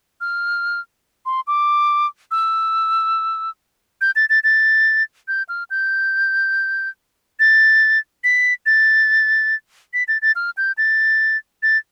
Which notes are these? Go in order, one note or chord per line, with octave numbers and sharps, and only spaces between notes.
F6
C6
D6
E6
G6
A6
A6
A6
G6
F6
G6
A6
B6
A6
B6
A6
A6
F6
G6
A6
A6